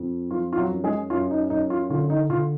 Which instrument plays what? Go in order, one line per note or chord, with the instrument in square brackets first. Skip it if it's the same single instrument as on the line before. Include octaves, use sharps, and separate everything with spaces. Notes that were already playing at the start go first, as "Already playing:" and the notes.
Already playing: [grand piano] F2
F3 F4
F4
F#3 F#4
F#2
G#3 G#4
F#2 F4
D#4
F#2 D#4
F4
D3 F4
D#4
D3 F4